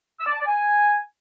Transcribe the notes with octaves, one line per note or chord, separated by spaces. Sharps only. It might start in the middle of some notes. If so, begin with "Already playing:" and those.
E6
D5
A5
D5
G#5